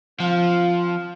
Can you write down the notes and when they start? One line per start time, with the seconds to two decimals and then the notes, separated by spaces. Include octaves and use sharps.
0.20 F3 C4 F5